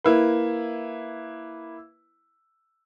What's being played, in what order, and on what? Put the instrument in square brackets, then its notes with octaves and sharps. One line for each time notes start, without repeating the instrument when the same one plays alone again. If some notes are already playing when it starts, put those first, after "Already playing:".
[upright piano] A#3 E4 B4